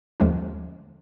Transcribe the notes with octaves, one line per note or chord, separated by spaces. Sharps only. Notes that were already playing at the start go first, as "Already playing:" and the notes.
D#2 D3 F3 G#3 C#4